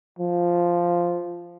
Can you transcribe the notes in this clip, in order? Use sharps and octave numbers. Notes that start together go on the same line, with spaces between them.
F3